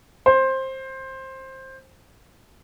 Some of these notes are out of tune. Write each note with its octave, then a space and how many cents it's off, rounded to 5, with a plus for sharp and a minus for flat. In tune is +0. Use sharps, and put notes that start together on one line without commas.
C5 +15